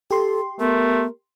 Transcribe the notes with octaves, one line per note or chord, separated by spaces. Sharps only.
G4 A4 C6
A3 B3 A#4